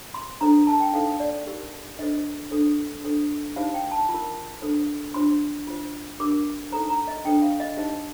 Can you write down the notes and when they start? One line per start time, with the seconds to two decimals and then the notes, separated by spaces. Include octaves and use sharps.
0.14 C6
0.41 D4 A4 C5 A#5
0.67 A5
0.80 G5
0.94 D#4 A4 C5 F5
1.20 D5
1.46 D#4 G4 A#4
1.99 D4 A4 C5 D#5
2.51 D4 A4 C5
3.04 D4 A4 C5
3.56 D#4 G4 C5 F5
3.74 G5
3.92 A5
4.09 F4
4.14 A#4
4.62 D4 A4 C5
5.14 D4 F4 C5 C6
5.67 F4 C5
6.20 D4 G4 A#4 D6
6.72 D#4 A4 C5 A#5
6.90 A#5
7.07 D#5
7.25 D4 A4 C5 G5
7.42 F5
7.60 D#5
7.77 D#4 G4 C5 D#5